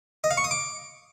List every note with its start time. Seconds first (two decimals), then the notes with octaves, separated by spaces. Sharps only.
0.24 D#5
0.31 F5
0.37 C#6
0.44 D#6
0.51 D6